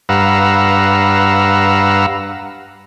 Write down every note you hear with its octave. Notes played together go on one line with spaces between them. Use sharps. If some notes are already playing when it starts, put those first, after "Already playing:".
G2 B4 F5 F#5 A#5 E6